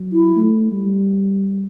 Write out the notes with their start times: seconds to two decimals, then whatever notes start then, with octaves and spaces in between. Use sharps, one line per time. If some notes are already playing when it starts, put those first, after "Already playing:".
Already playing: F#3
0.12 E4
0.36 A3
0.72 G3